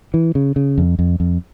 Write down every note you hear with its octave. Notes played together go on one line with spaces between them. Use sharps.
E3
C#3
C#3
F2
F2
F2